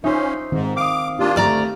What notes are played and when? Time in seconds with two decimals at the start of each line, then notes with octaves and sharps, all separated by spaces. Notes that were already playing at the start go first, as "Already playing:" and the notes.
0.04 C#4 D#4 F4 C5 E5
0.52 G#2 D#3 C4
0.77 F5 D6 D#6
1.19 A#3 D4 F4 G4
1.36 D2 A3 D5 A#5 F6